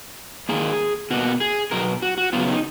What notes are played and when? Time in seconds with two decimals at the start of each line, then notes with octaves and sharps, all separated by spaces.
0.49 D#3 A#3 G#4
1.10 B2 A#3 F#4
1.40 G#4
1.71 B2 F#3 B3 A#4
2.02 F#4
2.18 F#4
2.33 C#3 F#3 B3 F4
2.48 D#4